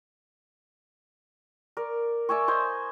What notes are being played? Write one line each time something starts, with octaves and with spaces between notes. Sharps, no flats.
A#4 D5
D5 E5 G#5 C#6
C5 D#5 G#5